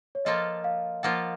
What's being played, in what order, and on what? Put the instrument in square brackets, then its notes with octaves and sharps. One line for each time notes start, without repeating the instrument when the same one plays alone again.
[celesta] C#5
[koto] F3 A#3 F4 A4 [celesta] D#5
[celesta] F5
[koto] F3 A#3 F4 A4 [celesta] F#5